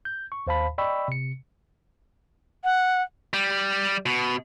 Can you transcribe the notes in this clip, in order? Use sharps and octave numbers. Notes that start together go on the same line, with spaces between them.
G6
C#6
D#2 C5 F5 A5 B5
D5 D#5 G5 B5 C#6 E6
C3 C#7
F#5
G3
B2